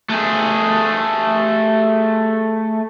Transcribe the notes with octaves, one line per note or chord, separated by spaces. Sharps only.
A3 G#4